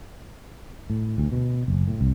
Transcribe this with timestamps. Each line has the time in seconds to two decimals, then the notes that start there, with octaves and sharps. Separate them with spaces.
0.90 A2
1.18 D2
1.32 B2
1.68 F#1
1.88 A2
2.01 C2